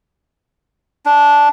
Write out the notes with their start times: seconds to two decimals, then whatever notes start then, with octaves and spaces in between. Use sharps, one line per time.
1.06 D4